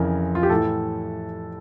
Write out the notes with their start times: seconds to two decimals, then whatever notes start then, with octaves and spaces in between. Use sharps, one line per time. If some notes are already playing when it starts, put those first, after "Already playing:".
Already playing: F2 C#3 E3 A#4
0.35 F4
0.43 G4
0.50 A2 E3 A4